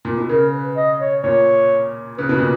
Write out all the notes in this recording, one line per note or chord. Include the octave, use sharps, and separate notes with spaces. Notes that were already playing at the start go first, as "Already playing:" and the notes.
A#2
B2
C#3 A#4
B4
D#5
C#5
A#2 C#5
C#3 B4
B2
A#2